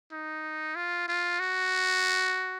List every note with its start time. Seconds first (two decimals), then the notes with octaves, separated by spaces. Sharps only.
0.12 D#4
0.76 F4
1.08 F4
1.40 F#4